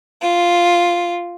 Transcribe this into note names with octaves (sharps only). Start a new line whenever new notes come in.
F4